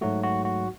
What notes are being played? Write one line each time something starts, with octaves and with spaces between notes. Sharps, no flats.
G#2 F#3 A3 F#4
F#4
F#4